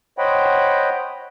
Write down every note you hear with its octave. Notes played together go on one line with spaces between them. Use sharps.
C5 C#5 D#5 F#5 G5 B5